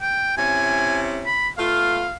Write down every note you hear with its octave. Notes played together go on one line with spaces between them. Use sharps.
G5
C3 C#4 E4 G#5
B5
A3 B3 F4 F5